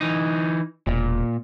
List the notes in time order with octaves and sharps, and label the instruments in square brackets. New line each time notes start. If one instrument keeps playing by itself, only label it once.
[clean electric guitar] E3 D#4
[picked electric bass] E1 [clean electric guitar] A#2